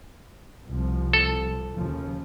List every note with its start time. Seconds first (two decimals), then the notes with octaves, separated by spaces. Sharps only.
0.67 C2 F3
1.13 A4
1.75 D#2 C#3 F3